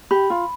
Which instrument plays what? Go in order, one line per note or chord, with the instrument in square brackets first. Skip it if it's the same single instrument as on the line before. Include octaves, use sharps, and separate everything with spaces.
[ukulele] G4 [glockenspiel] B5
[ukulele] F4